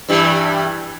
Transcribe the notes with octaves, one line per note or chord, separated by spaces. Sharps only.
G2 E3 G3